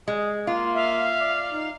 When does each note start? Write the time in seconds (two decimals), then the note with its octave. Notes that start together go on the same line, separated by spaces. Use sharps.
0.08 G#3 G#4
0.47 A#3 F4
0.75 E5 F5
1.20 D5
1.52 D#4